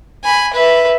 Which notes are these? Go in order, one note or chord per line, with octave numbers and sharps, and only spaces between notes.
G#5 B5
B4 E5